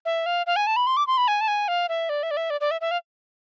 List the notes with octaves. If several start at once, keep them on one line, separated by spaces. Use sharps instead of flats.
E5
F5
F5
G#5
A5
B5
C6
D6
C6
B5
G#5
A5
G#5
F5
E5
D5
E5
D5
E5
D5
D5
E5
E5
F5